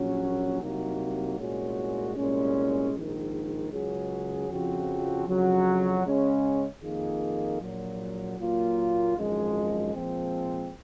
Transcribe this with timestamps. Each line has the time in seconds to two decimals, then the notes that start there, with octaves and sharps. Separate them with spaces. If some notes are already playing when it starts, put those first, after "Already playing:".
Already playing: A#1 A#2 F#3 C#4
0.61 C2 C3 F#3 A#3 D#4
1.38 C2 A#2 G#3 C#4 F#4
2.16 C2 A#2 G#3 C#4
2.93 A#1 G#2 D#3
3.72 C#2 C#3 F#3 C#4 G#4
4.49 F2 C#3 F3 C4 F#4
5.27 F2 C#3 F#3
6.05 C#3 G#3 C#4
6.82 F2 D#3 A#3 F4 G#4
7.60 A#1 A#2 F#3
8.38 A#2 F#3 A#3 F4
9.16 G#1 F#2 F3 G#3
9.94 A#2 F3 G#3 C4